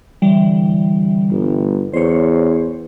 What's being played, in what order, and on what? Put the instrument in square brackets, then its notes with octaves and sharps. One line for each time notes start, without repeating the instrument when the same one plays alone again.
[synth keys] D3 E3 G3
[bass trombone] G1
[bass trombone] E2 [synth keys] C5 C#5